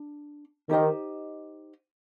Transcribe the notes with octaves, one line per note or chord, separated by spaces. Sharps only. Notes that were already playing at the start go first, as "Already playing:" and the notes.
Already playing: D4
D#3 D#4 G4 C5 D#5